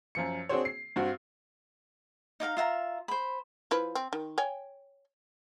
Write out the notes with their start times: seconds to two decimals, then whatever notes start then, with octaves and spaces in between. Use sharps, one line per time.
0.15 F#2 F3 C#7
0.49 C4 D4 F#4 G#4 C5 C#5
0.65 C7
0.96 G2 C4 F#4
2.40 D#4 D5 F5 A#5
2.57 F4 E5 F#5 A#5
3.08 C5 B5
3.71 F3 E4 B4
3.95 C4
4.13 D#3
4.38 C#5 G5 G#5